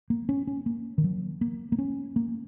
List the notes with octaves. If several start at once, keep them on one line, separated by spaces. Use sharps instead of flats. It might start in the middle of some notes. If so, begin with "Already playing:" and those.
A#3
C#4
C#4
A#3
D#3
F#3
A#3
A#3
C#4
A#3